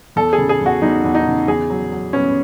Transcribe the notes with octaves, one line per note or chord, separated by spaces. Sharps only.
E2 A4
G#4
C#3
G#4
E2
F#4
E2 D#4
E2
D#4
C#3
E2 G#4
F#3
F#3
B3 C#4